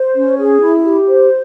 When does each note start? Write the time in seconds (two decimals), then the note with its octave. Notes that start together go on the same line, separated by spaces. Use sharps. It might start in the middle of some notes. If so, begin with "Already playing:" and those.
Already playing: C5
0.15 C#4
0.37 G#4
0.61 E4
0.83 G4
1.07 C5